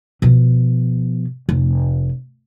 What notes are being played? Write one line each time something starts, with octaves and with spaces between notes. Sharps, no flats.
B2 F3
F1